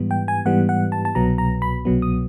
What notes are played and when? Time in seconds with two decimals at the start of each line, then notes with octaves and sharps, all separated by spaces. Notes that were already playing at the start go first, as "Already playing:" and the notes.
Already playing: G#2 E3 G3 B3
0.11 G5
0.28 G#5
0.45 G#2 E3 G3 B3 F#5
0.69 F#5
0.92 A5
1.05 A5
1.15 C2 B2 F#3 B3 A#5
1.38 A#5
1.62 B5
1.85 C2 B2 F#3 B3
2.02 D#6